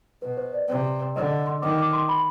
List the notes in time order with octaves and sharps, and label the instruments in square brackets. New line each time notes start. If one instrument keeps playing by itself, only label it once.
[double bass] B2 [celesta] B4
[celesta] C5
D5
[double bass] C3
[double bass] D3 [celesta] D#5
[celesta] D#5
C6
[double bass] D#3 [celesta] D6
[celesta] D6
C6
B5